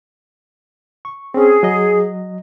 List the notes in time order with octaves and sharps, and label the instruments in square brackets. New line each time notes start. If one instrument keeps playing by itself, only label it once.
[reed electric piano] C#6
[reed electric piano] C4 C#4 [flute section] G#4
[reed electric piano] F#3 D#5